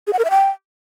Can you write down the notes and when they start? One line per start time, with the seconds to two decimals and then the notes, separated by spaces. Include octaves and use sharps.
0.07 G#4
0.13 F#5
0.19 A#4
0.25 E5
0.30 G5